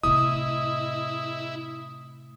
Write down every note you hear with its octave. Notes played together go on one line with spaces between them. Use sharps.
A2 C3 E4 D#5 D#6